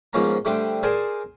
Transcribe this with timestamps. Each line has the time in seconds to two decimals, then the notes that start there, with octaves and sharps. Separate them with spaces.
0.13 G#2 F3 A#3 B3 C#4 A#5
0.45 D3 G3 A3 C4 D4 D6
0.83 G#4 A#4 C5 D5 G#5 A5